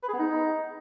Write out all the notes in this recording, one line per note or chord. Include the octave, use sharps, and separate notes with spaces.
B4
G#4
B3
D#4